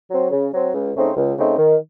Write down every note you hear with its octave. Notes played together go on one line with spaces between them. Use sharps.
F#3 C4
C#3
F#3 C4
C#2
C#3 A3 C4 D#4
C#2
C#3 A3 C4 D#4
D#3